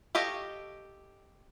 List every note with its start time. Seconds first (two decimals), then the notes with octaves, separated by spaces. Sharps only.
0.15 G4 A4 C#5 D#5 F5